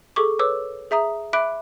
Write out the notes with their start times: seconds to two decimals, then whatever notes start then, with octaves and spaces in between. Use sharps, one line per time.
0.16 G#4 A4 C#6 D6
0.39 B4 C#5 D6 E6
0.91 G#4 E5 A#5 D#6
1.33 E5 B5 D6 F#6 D7